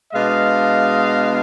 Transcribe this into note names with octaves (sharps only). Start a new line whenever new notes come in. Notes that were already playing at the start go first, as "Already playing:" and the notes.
B2 G#3 B3 D4 D#5 F5